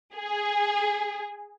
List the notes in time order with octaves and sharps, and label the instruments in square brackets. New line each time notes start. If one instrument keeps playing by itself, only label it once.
[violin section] G#4